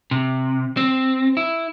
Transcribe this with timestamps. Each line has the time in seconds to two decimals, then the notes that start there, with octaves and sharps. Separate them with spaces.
0.11 C3
0.77 C4
1.37 E4